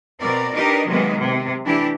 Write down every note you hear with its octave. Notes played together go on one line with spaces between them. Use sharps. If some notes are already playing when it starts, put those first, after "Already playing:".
B2 C4 A#4 D5
D4 D#4 G4 A#4 B4 D#5
C3 D#3 F#3 G#3 A#3 B3
C3
E3 A3 D4 E4 G4